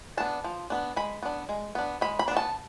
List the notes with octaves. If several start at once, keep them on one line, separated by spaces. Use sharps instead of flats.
B3 D4 A5
F3
B3 D4
G#3 B5
B3 D4
G#3
B3 D4
G#3 B5
B5
D4
B3
A5